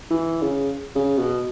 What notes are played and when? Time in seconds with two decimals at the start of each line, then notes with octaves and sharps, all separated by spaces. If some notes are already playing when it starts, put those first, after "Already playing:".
0.11 E3
0.42 C#3
0.95 C#3
1.18 B2